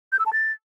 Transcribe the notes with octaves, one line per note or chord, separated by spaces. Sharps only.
G6
E6
A5
A6